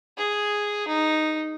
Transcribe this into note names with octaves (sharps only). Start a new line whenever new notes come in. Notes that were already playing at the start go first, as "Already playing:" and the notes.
G#4
D#4